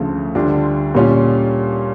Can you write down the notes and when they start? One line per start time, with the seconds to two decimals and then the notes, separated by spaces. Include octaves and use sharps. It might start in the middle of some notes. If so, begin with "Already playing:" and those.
Already playing: D2 C#3 F3 A3
0.35 D2 D3 G3 D4 F4
0.95 A#2 G3 C#4 F4